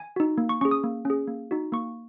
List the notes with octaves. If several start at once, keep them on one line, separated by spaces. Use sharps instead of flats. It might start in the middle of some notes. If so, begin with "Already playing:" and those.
Already playing: G#5
D#4 F#4
A#3
C#6
C#4 G#4 C#6
D#6
A#3
C#4 G#4
A#3
D#4 F#4
A#3 C#6